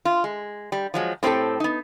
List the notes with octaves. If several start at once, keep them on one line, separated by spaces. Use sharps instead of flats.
F4
G#3
G3
F3 F#3 G#3
A2 C4 D4 G4 A4
B3 D#4